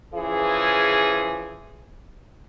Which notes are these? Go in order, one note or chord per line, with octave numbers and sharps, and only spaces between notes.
C#3 E3 F3 G#4